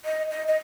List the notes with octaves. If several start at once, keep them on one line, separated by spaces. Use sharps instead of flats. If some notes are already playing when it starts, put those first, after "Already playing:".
D#5
D#5
D#5